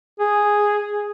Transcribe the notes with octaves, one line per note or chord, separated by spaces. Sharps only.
G#4